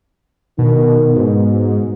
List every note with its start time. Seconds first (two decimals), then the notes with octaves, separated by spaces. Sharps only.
0.58 B2 D#3
1.16 G#2 B2